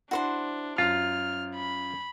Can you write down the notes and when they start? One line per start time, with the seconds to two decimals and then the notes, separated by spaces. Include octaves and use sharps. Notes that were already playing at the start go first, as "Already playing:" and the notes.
0.11 D4 E4 F#4 C5 C6
0.78 F#2 F4 F6
1.55 B5